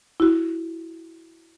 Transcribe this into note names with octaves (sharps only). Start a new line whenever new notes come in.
E4 F#4